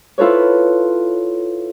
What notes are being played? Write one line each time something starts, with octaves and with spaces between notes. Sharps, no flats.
E4 F4 A4 B4 C#5